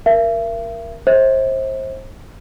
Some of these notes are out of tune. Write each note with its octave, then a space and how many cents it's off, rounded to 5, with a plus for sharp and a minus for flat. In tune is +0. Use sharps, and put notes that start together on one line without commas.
A#4 +10 E5 +40
C5 +30 E5 -40